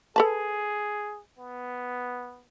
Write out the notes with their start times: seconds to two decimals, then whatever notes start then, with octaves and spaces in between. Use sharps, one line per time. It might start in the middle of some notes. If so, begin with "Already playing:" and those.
0.16 G#4 A4 B4 A5
1.38 B3